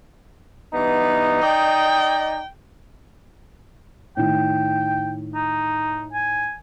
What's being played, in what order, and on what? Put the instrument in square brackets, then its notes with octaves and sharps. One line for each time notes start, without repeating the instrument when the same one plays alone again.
[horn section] G2 E3 B3 [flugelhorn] D#4
[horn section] D5 D#5 [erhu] G5
[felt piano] A2 D#3 [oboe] G5
[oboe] D#4
G#5